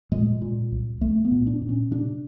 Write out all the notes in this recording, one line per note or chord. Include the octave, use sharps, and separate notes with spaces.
A#2 G#3
A#2
C2
C2 A3
B3
A#2
D4
A#2
C#4
C3 D4